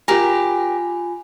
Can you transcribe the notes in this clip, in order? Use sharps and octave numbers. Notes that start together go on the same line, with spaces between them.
F4 G4 A#4 G#5